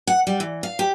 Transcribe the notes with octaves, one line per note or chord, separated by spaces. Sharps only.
F#5
G3
E3
F5
G4